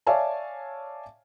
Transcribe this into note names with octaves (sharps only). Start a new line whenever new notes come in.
C#5 D5 E5 F5 G#5 A5